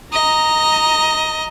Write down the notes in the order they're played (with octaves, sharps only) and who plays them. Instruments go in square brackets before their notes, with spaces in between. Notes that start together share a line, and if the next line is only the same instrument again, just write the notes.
[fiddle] D#5 [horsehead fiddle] A#5